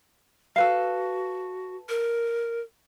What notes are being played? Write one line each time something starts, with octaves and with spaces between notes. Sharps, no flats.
F#4 A4 B4 F5
A#4